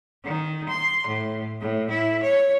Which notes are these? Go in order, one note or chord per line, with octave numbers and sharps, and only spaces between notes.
D#3
C6
A2
A2
E4
C#5